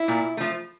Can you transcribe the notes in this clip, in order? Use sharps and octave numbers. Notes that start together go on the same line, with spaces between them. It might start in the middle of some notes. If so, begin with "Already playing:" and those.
Already playing: E4
A#2
F3 A3